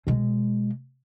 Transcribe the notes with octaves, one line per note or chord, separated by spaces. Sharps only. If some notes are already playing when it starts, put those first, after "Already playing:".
B2 G#3